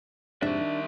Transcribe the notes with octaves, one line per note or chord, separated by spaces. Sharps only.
F2 G#2 C3 G3 D4 E5
D#3